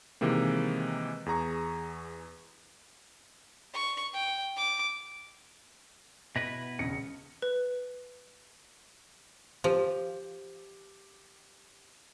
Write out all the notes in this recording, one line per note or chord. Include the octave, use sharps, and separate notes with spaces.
C3 D#3 E3 G#3 A#3
E2 G#4 A#5 C#6
C#6
G5
D6
B2 E4 B4 A#6
E1 C#3 A#6 C#7
B4
F3 G4